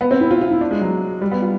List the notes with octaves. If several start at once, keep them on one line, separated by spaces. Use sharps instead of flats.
B3
C4
E4
F4
F4
E4
D4
G#3
F#3
G3
B3
F4